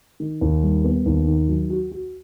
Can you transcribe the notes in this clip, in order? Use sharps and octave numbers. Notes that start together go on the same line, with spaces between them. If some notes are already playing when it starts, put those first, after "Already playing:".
D#3
D#2
G3
B3
D#2
D#3
F#3
F#4
F#4